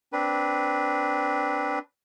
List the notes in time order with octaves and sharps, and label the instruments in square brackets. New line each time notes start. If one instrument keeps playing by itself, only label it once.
[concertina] C4 D4 B4